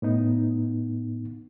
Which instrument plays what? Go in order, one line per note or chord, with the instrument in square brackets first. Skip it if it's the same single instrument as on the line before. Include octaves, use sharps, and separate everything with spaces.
[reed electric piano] A2 B3 D#4